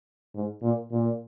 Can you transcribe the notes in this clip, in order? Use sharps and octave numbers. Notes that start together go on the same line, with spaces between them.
G#2
A#2
A#2